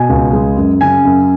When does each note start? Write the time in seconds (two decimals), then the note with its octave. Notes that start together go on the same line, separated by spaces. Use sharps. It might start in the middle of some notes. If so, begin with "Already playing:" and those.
Already playing: B2 G#5
0.09 C#2
0.33 G#3
0.57 F#2
0.81 C#3 G#5
1.05 F#2